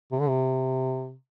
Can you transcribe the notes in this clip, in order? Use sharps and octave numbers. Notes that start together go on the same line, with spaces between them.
C3
D3
C3